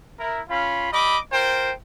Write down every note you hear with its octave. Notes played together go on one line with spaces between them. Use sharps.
E4 A#4
C#4 F4 F5 B5
G3 D#5 B5 D6
F4 A#4 C5 G5